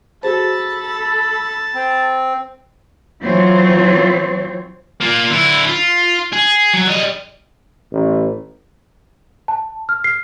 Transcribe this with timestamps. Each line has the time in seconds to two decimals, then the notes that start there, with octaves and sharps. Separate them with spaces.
0.23 F#4 G#4 A4 C5 A5 B5
1.75 C4
3.21 E3 F#3 C4 F4 C5 C#5
5.01 A#3 F4
5.31 D3 E4
5.67 F4
6.33 G#4
6.74 F#3
6.88 G3 D#5
7.92 A1
9.48 A5
9.89 F6
10.04 C7